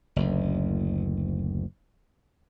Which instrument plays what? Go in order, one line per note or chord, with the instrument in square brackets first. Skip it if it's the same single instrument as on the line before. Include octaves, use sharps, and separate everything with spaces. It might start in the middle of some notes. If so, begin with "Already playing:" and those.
[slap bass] F#1 D2